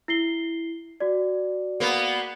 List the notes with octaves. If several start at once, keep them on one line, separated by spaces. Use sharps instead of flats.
E4 C7 G7
F#4 D5
A#3 B3